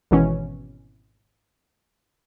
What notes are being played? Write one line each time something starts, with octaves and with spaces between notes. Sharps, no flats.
G#1 B2 E3 C#4